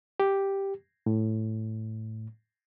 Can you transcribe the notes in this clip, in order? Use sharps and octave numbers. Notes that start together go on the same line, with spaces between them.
G4
A2